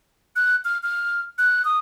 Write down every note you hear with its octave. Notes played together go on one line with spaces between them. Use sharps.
F#6
F6
F6
F#6
D#6